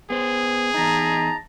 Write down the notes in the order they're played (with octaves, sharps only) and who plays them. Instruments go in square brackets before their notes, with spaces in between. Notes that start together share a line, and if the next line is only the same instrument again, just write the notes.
[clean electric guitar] B3 C5 [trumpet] G#4
[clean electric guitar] E2 D#4 [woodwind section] D#5 A5 A#5